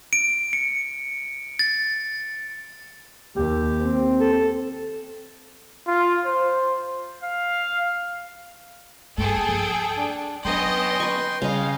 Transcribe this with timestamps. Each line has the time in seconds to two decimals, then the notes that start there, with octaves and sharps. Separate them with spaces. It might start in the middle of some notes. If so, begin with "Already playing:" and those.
0.13 D7
0.53 C#7
1.59 A6
3.36 D#2 G4
3.82 C4
4.20 A4
5.87 F4
6.26 C5
7.24 F5
9.18 G2 A#3 G#4 A4 G5
9.49 F3
9.97 D4
10.45 F#3 B3 C#4 D4 D#5 G5 C6
11.00 B4 C#6
11.42 C#3 G3 D#5 F5